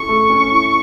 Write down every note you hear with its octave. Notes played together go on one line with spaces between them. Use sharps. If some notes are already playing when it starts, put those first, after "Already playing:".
Already playing: C#4 E4 A4 C#6
A3
C#4
E4